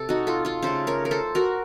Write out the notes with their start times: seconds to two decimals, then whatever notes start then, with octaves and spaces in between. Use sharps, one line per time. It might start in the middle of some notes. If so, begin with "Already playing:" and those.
Already playing: C3 A4
0.09 D#4 F#4
0.27 F4 A4
0.45 F4 A4
0.62 C#3 A3 A4 C5
0.87 A#4 C#5
1.05 A#4
1.11 A4 C5
1.35 F#4 A#4